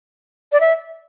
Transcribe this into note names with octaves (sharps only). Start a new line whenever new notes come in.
D5
E5